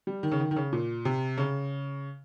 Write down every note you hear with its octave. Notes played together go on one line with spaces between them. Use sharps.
G3
D#3
C#3
D#3
D#3
C#3
A#2
C3
C#3